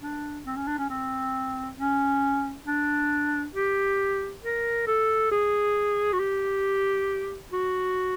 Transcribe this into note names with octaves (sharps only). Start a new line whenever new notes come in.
D4
C4
C#4
D4
C#4
C4
C#4
D4
G4
A#4
A4
G#4
F#4
G4
F#4